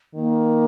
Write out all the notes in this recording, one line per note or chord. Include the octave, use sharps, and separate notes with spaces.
D#3 A#3